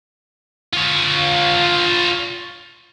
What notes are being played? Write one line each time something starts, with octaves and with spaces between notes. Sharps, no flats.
F4 C#5